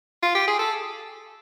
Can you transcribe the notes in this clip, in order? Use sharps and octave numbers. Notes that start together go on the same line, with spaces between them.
F4
G4
G#4
A4